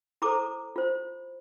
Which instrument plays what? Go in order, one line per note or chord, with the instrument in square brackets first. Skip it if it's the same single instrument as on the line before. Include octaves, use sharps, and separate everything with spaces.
[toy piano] E4 A4 C5 A#5 D6
F4 C5